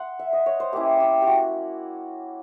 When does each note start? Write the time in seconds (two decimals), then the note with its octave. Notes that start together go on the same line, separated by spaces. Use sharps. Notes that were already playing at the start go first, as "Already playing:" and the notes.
Already playing: F#5 C6
0.19 E5
0.33 D#5
0.46 C#5
0.60 C5
0.73 A#3 C#4 E4 G4
1.00 G4
1.22 G4
1.27 F#4